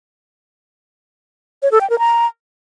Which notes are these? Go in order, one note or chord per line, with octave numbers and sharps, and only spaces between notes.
C#5
A4
G5
A#4
A#5